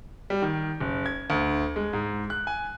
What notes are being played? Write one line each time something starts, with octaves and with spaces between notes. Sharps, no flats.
G3
D#3
F#1
G#6
D2
G#3
G#2
F#6
G#5